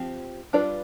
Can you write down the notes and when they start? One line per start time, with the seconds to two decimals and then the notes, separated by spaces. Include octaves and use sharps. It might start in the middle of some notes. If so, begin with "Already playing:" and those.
Already playing: F3 C4 G4
0.53 G3 D4 F4 B4 D5